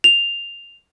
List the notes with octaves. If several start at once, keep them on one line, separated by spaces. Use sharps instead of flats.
F7